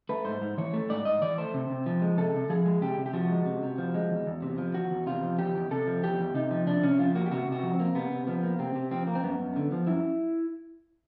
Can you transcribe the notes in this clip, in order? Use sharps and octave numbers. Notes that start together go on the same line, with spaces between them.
A3 B4
G#2 C5
G#2
E3 C#5
A3
G#2 D5
G#2 D#5
E3 D5
A3 C5
C3
C3
F3
G#3
C3 A4
C3
F3 G#4
G#3
C3 G4
C3
G4
F3 F#4
G#3
C3
C3
F3
G#3
E2
E2
C3
F3
E2 F#4
E2
C3 F4
F3
E2 G4
E2
C3 A4
F3
E2 G4
E2
C3 D#4
F3
C3 D4
C3 C#4
F3 F4
A#3 F#4
G4
C3 F#4
C3 F#4
F3
C4
A#3
C3 B3
C3
F3 B3
A#3
C3 C4
C3
F3 C4
A#3
C4
F#2 B3
F#2
D3
F3
F#2 E4